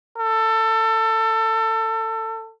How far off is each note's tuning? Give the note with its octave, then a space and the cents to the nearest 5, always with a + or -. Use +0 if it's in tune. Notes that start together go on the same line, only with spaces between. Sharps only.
A4 +25